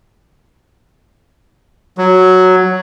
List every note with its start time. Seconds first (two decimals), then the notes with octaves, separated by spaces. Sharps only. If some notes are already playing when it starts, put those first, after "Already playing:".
1.98 F#3